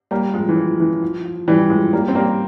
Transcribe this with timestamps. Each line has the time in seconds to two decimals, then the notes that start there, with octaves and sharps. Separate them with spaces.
0.11 G3 A#3
0.34 F3 G#3
0.49 E3
0.56 F3
0.80 E3
1.03 F3
1.25 F3
1.48 E3 G3
1.70 F3 G#3
1.93 G3 A#3
2.08 C4
2.15 G3 A#3